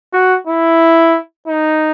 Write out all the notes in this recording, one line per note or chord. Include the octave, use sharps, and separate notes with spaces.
F#4
E4
D#4